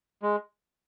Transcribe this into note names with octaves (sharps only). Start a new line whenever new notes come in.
G#3